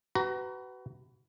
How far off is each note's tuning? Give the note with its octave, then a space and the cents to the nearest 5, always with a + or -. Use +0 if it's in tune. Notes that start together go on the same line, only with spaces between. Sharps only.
F#4 +30 B4 +15 A#5 +0